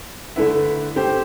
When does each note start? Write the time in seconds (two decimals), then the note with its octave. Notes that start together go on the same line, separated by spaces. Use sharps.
0.36 D3 A3 E4 B4 E5
0.96 A3 C4 G4 C5